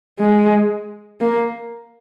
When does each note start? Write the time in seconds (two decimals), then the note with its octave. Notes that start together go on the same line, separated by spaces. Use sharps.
0.19 G#3
1.21 A#3